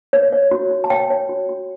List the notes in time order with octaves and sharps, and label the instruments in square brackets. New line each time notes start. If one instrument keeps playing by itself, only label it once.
[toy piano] C#5
C#5
F#4
F#4
A5
C#5 G5
C#5
F#4
F#4